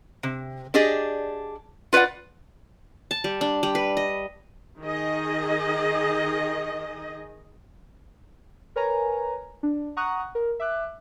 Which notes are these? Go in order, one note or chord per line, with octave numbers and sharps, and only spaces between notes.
C3
D4 G4 G#4 D5 D#5
F4 B4 C#5 D5 F#5
A5
G3
D4
G3
B4
D#5
D#3 G#4 D#5
A#4 B4 C#5 G#5 A#5
D4
F#5 A#5 C#6 D#6 F#6
A#4
E5 D6 F#6